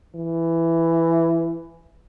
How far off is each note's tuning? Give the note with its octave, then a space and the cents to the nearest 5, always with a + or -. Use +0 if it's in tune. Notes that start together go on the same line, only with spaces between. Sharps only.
E3 +10